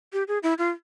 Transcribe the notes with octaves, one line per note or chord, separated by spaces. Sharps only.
G4
G#4
E4
F4